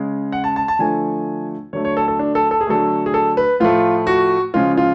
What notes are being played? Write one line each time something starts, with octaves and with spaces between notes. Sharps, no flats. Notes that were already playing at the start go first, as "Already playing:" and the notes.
Already playing: C#3 G#3
F#5
A5
A5
A5
D3 F3 A3 G#5
D3 F#3 A3 C#5
C#5
A4
A4
D4
A4
A4
G#4
D3 F#3 A3 A4
G#4
A4
B4
A2 F3 A3 F4
F#4
C#3 F3 G#3 F4
F4